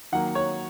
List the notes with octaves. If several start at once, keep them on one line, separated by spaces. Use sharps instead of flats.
D#3 F#3 A#3 F#5
C#5